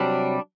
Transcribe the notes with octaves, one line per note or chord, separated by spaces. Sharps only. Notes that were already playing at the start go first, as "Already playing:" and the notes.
Already playing: C3 F#3 G3 D4